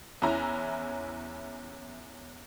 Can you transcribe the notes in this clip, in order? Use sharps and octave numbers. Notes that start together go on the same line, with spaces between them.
E2 C#4 E4 A#5